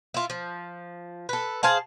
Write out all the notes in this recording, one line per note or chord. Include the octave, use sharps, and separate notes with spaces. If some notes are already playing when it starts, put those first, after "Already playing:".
E4 F4
F3
A4 B4
G#4 C5 F5 A5